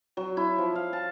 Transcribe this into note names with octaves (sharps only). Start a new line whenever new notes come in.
F#3
E4
F3
F5
A5